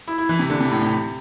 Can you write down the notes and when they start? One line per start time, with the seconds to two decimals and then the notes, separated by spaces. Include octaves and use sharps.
0.08 E4
0.18 E4
0.29 E3
0.39 C3
0.50 D3
0.60 C3
0.71 A2
0.82 C3